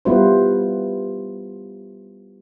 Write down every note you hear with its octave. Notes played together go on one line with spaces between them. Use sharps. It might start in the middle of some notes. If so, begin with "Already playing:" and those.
G3 B3 E4 F4 B4 C5